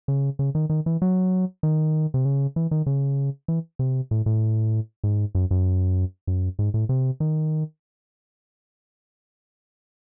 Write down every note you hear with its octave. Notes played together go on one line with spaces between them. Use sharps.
C#3
C#3
D#3
D#3
E3
F#3
D#3
C3
C#3
E3
D#3
C#3
E3
C3
A2
A2
G#2
F#2
F#2
F#2
G#2
A2
C3
D#3